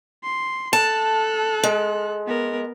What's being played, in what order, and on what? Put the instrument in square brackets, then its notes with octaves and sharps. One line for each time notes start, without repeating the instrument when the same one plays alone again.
[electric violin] C6
[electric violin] A4 F#6 [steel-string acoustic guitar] A5
[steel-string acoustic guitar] G#3
[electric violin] B3 A#4